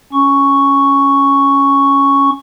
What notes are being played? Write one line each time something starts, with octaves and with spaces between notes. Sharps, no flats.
C#4 C#6